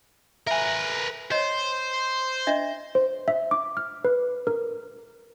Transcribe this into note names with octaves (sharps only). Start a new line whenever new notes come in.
A#4 B4 E5 G#5
C5 C#5 D#5
D4 D#5 E5
C5
E5
D6
F6
B4
A#4